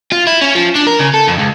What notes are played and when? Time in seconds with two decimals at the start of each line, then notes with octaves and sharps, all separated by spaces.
0.12 F4
0.27 E4
0.41 C#4
0.55 F3
0.75 D4
0.87 A#4
0.99 C#3
1.14 A4
1.28 F2
1.39 C#2